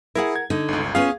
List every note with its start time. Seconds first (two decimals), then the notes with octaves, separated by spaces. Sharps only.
0.15 E4 G#4 A#4 F5 F#5
0.36 G#6
0.50 D3 D#4
0.68 G1 C#2
0.95 B3 C#4 F4 G#4 F5